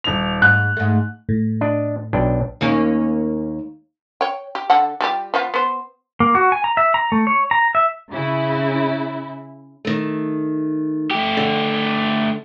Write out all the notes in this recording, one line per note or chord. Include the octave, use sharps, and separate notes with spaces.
D#1 F7
G#2 F#6
G#2 A3
A2
D4 D#5
B1 D4 G5
D#2 A#3 C#4
C#5 G5
G4
D3 A4 F#5
G3 F4 G4
F3 B3 F4
B3 C5
A#3
F#4
G#5
A#5
E5
A#5
A3
C#5
A#5
E5
C#3 E4
D#3 A3
A3 G4
D3